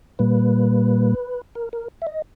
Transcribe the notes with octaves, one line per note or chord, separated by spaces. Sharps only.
A#2 G3 A#3 B4
A#4
A#4
E5
D#5